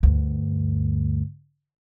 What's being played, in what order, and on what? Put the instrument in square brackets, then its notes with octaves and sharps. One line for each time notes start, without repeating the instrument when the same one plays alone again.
[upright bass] D2 G2